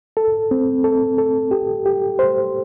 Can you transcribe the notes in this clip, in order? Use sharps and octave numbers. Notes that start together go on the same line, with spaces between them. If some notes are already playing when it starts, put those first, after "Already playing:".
A4
C4
A4
A4
G4
G4
C5